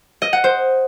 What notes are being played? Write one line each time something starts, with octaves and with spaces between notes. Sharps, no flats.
D#5
F#5
C5